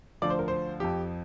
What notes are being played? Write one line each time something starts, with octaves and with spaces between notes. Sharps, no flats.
D2 D3 F3 D5
C5
A#4
C5
F2 F3 G4